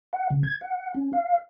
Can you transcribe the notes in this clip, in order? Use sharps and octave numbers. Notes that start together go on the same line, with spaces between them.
F#5
C#3
G#6
F#5
C#4
F5